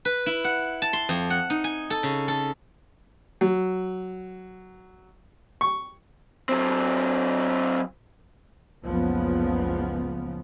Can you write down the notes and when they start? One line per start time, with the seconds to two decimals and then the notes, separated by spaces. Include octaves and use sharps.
0.05 B4
0.26 E4
0.44 F#5
0.82 A5
0.93 C6
1.09 F2
1.30 F#5
1.50 D#4
1.64 G#5
1.90 A4
2.03 C#3
2.28 A4
3.41 F#3
5.61 C#6
6.49 F#3 C4
8.84 F#1 C#2 C#3 F3 B3